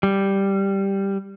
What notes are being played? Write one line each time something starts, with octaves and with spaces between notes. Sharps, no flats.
G3